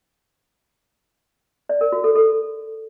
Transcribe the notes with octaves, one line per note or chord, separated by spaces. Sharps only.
D5
A#4
F#4
A4
A4